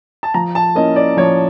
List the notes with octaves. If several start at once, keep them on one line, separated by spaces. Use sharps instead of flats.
A5
F3 A#5
A5
A#3 C#4 E4 D#5
D5
F3 C#5